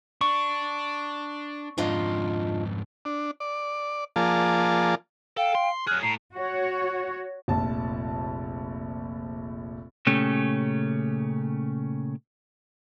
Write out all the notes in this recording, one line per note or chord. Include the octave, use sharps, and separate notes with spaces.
D4 C#6
F2 G#2 D4 F4 D#5
D4
D5
F3 A#3 F4 G#4 D5 A5
A4 F5 G5
C6
F#3 G#4 F6 F#6
A2 A#5 C7
F#4 C#5
F1 A#1 A5
A#2 C#3 A3 C#4 G4